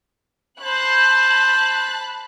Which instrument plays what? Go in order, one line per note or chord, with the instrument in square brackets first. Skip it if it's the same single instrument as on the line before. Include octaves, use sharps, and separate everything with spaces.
[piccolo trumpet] C5 [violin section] A5 B5 F#6